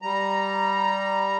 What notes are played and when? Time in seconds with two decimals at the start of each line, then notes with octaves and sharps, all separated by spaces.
0.02 G3 A#5